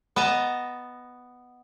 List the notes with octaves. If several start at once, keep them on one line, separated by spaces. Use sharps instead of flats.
B3 D#5 A5 A#5